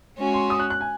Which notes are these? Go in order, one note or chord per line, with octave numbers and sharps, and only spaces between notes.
G#3 C#4 F#4
C6
D#6
F#6
F#6
G#5